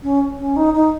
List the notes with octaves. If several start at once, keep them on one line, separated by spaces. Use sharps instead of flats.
C#4
C#4
D#4
D#4